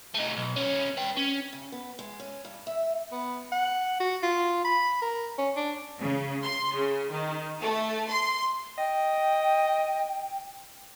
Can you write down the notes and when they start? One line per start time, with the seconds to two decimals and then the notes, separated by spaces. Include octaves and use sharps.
0.14 A3 D#4
0.37 B1
0.56 D#2 C#4
0.97 B4 G5
1.17 C#4
1.53 C#3
1.72 B3
1.99 G#3
2.20 C#4
2.45 G2
2.67 E5
3.12 B3
3.52 F#5
4.00 F#4
4.23 F4
4.65 B5
5.02 A#4
5.38 C#4
5.56 D4
5.99 C#3
6.44 C6
6.77 C#3
7.12 D#3
7.59 A3
8.08 C6
8.78 D#5 G5